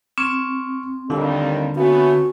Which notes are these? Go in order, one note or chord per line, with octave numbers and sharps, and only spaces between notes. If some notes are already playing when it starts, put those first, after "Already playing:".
C4 C#6 D6 F6
D#2 D3 D#3 G3 F4 A4
A3 B3 C#4 F#4